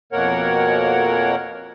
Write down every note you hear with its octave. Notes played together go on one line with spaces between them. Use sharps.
F2 B2 A#3 A#4 C#5 F#5